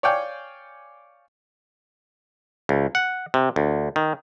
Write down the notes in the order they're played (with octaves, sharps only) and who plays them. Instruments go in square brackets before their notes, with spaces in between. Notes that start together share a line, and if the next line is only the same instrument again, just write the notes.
[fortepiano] C#5 D5 F5 G5 G#5
[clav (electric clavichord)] C#2
F#5
C3
D2
D#3